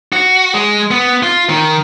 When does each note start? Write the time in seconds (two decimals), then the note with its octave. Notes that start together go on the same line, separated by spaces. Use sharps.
0.13 F#4
0.54 G#3
0.91 B3
1.23 F4
1.49 D#3